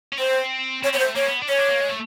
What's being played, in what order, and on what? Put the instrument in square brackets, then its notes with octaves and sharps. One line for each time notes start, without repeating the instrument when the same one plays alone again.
[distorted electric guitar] C#4
[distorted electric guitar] C4 [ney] C5
[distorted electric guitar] C4 [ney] C#5
[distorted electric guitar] B3 [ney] C#5
[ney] C5
[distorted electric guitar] A3
[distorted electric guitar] A#3 [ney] C#5
[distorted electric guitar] B3
D4
[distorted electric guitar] C#4 [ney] C#5
[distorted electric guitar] D4
A#3
G#3
A3